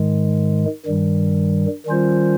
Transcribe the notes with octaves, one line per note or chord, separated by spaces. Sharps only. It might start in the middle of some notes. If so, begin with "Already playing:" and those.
Already playing: G#2 D#3 G#3
G2 D#3 G3
D#3 G3 C#4 F4 C5